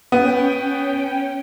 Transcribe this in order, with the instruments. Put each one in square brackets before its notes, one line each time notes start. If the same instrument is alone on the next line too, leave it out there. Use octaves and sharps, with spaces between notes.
[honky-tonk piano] B3 [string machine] C#4 G5